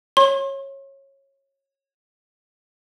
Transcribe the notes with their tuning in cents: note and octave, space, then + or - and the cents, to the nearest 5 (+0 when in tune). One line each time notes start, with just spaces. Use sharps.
C#5 -20 C6 +40